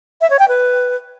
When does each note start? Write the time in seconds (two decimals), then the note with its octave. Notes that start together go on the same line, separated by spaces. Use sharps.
0.21 E5
0.30 C#5
0.39 G5
0.48 B4